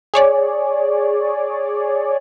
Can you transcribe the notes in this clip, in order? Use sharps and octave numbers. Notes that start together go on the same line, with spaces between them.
G#4 C#5 D5